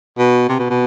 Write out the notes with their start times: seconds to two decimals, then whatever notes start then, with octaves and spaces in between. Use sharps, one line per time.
0.18 B2
0.49 C3
0.59 B2
0.70 B2